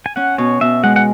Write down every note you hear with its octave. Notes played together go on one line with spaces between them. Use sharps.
G#5
C#4 F#5
B2 C#5
B2 E5
G#3 F#5
F#5